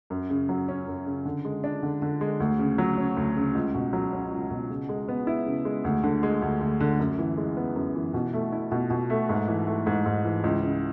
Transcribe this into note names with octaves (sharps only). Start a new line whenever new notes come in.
F#2
C#3
F#3
C#4
F#2
C#3
D3
G#3
D4
D3
D3
G#3
D2
C#3
F#3
C#4
D2
C#3
C#2
B2
F#3
C#4
C#2
B2
C#3
G#3
B3
E4
C#3
G#3
D2
D3
G#3
D2
D2
D3
F#2
E3
G#3
B3
F#2
E3
B2
A3
E4
B2
B2
A3
G#2
E3
A3
G#2
G#2
E3
C#2
C#3